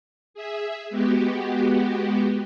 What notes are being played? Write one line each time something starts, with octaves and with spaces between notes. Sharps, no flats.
G#4 E5
G#3 B3 F#4 G4